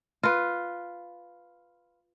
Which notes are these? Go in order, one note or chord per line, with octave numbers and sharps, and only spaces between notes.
F4 B4